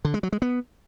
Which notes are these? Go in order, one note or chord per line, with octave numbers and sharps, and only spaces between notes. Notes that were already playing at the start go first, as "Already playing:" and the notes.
D3
G#3
F#3
G#3
B3